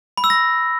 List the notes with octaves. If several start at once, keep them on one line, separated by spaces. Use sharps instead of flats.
B5
E6
A#6